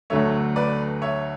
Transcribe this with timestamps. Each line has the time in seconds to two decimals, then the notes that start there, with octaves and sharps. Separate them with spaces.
0.10 D2 D3 F#3 A3 C#5 E5
0.56 B4 D5
1.02 C#5 E5